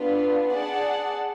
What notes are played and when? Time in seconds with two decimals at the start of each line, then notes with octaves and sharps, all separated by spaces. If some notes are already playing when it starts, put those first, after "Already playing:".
Already playing: B3 D4 F4 B4
0.51 G#4 D5 F#5 A5